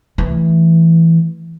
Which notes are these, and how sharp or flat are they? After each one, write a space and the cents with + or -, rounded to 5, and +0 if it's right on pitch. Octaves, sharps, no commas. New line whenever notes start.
E3 +0 A3 +0